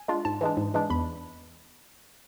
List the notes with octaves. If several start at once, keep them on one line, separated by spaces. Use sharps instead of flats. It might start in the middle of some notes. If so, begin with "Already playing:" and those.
Already playing: G#5
G#3 D4 F4
G#2 A5
E3 G#3 D4
G#2
E3 G#3 D4
E2 B5